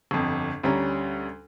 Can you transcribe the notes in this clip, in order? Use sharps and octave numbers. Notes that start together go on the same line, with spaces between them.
G1 F2
D2 G3 C#4 A#5